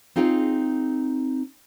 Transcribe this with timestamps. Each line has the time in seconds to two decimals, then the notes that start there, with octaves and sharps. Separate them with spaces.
0.16 C4 D#4 F4 G#4 G5